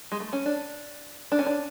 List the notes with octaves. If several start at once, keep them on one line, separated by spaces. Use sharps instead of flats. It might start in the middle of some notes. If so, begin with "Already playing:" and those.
G#3
A3
C#4
D4
D4
C#4
D4